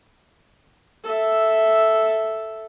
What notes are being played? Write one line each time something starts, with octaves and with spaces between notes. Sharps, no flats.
A4 E5